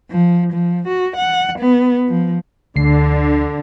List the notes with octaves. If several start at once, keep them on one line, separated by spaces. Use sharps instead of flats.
F3
F3
F#4
F#5
B3
F3
D2 D3 C7